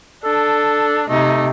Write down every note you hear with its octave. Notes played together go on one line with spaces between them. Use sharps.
D4 A4
C3 A3 D#4